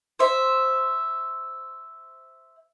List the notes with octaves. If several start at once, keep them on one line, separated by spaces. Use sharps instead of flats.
C5 E5